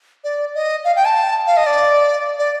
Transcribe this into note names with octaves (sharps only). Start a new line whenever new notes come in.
D5
D#5
F5
G5
A5
F5
D#5
D5
D5